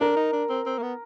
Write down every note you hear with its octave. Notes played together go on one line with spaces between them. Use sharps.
D4 A#4
D#4
D4
C4
C4
A#3
B3